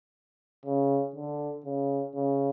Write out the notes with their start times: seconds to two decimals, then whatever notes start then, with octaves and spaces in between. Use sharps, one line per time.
0.66 C#3
1.15 D3
1.65 C#3
2.15 C#3